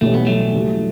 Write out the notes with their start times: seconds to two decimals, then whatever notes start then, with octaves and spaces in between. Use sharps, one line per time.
0.01 B1 A2 E3 G3 A3 C#4
0.14 B3
0.26 F#3 A3
0.53 E2 C#3 G3